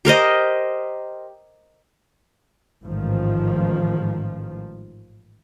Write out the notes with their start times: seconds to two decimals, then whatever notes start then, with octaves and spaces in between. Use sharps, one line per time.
0.05 G4 A#4 C5 D#5
2.83 A1 G#2 D#3 F3